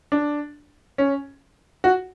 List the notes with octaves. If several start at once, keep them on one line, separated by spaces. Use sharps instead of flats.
D4
C#4
F#4